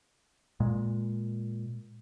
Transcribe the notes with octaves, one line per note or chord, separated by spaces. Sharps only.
A#2 G#3